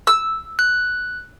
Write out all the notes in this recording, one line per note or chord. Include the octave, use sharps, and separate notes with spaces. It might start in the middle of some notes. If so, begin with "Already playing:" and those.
E6
F#6